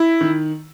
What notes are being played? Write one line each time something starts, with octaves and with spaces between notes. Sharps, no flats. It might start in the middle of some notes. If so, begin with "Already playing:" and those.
Already playing: E4
D#3